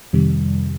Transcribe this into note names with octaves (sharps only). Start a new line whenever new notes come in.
F2 C3 D#3 G3